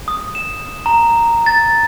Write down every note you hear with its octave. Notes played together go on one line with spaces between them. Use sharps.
D#6
E7
A#5
A6